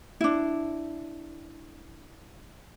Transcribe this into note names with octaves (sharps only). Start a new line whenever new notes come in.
D4 E4